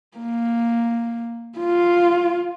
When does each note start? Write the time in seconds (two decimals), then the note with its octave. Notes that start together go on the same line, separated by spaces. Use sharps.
0.18 A#3
1.59 F4